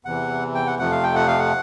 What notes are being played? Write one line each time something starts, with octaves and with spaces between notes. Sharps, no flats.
E2 C3 E3 F#5
G5
F#5
F2 C3 F3 A3 F#5
F5
G5
F#5
F5
F#5